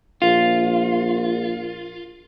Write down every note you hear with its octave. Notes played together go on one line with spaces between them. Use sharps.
A#1 F4